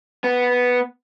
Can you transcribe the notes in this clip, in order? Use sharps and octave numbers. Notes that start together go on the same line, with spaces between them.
B3